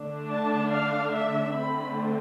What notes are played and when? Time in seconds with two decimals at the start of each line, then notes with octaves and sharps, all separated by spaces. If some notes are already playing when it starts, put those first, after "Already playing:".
Already playing: D3 A3 D4
0.29 A5
0.71 F5
1.13 E5
1.53 D3 A3 C4 B5